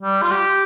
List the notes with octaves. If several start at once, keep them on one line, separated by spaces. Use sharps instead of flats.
G3
F4
G4